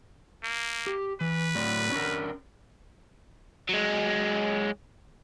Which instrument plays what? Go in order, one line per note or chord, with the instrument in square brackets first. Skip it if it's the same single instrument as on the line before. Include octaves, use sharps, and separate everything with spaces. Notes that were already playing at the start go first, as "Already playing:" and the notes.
[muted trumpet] A#3
[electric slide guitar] G4
[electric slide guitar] E3 [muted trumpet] B4
[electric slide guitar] A2 F#3 D5
C#4 D4 A#4
[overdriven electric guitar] F#3 G#3